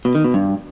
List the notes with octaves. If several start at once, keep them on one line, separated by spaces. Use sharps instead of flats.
B2
D#3
B2
G2